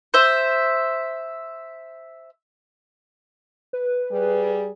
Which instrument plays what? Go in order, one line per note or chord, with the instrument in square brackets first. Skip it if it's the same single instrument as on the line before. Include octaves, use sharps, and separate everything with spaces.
[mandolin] C5 E5
[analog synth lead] B4
[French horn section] G3 G#4